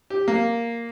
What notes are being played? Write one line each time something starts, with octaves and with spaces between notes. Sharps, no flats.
G4
A#3